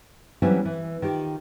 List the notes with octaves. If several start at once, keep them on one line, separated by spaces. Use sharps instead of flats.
E3 F#3 G3 C4 C#4 E4
E3
D#3 F4 G4